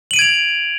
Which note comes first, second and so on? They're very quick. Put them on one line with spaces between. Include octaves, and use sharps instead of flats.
F#7 D#7 D7 G#6 F7